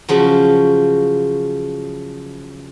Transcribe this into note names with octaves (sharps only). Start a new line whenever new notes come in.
C#3 F3 F#3